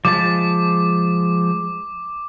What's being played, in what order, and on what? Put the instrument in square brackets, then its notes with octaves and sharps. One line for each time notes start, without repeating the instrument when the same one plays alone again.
[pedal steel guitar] F3 G#3 A5 [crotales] D6